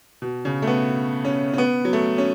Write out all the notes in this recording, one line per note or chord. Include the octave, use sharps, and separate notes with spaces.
B2
C#3
A3
B3
C#4
C#4
B3
F#3
A3
C#4